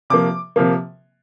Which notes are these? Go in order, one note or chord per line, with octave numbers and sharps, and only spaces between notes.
C3 F3 A#3 D6
C3 F3 A#3